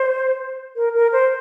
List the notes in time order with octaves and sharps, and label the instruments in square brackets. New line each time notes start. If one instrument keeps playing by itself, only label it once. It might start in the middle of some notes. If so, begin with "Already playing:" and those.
Already playing: [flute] C5
A#4
A#4
C5